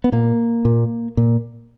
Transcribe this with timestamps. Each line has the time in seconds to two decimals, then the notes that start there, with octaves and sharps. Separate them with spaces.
0.04 B3
0.12 A#2 A#3
0.65 A#2
1.17 A#2